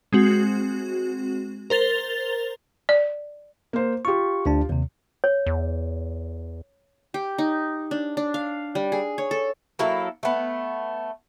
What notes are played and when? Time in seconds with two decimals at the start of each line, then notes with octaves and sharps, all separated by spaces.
0.13 G#3 C4 F#4
1.70 A#4 C5 A6 F7 G7
2.89 D5
3.73 A#3 C5
4.05 F4 G4 C#6
4.46 D2 D4 A5
4.69 D#2 C3
5.24 C#5
5.46 E2
7.14 G4
7.38 D#4
7.91 D4
8.17 D4
8.34 F5
8.75 G3
8.92 G#4
9.18 C#5
9.31 A4
9.79 F#3 A#3 E4 A4
10.23 A3 B3